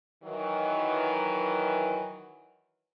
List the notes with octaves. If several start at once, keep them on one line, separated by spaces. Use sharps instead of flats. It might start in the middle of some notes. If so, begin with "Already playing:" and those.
D#3 E3 F#3